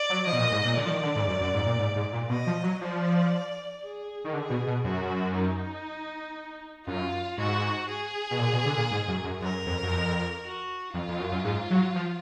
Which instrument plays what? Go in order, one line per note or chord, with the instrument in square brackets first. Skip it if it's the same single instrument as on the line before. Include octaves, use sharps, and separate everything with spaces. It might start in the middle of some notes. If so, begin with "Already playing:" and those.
Already playing: [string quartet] D5
[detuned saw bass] F#3
[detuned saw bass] F3 [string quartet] D#5
[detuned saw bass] B2
A#2
G#2
A#2
[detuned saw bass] D3 [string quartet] D5
[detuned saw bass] F3
D#3
D3
G#2
F#2
F#2
G#2
A#2
G#2
G#2
A#2
[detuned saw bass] B2 [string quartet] D#5
[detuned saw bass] F3
F#3
[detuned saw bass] F3 [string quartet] D5
[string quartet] G#4
[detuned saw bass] D#3
[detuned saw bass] D3 [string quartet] G#4
[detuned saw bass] B2
B2
[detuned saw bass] F#2 [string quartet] F#4
[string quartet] D#4
[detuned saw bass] F#2 [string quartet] F4
[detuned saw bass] G#2 [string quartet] F#4
[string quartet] G#4
[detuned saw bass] B2
A#2
B2
D3
A#2
G#2
F#2
F#2
[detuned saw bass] F#2 [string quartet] A#4
[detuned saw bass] F2
F#2
F2
[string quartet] F#4
[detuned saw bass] F2 [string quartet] F4
[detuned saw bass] F2
F#2
F#2
G#2
F#3
F3